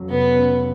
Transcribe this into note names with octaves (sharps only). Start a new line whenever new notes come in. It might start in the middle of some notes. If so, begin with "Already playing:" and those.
Already playing: F2 C#3 F#3
F1 B3
C#3